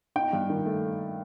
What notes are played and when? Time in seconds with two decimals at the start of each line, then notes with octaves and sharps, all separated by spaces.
0.16 D#4 G5
0.33 G2
0.50 D#3
0.66 A3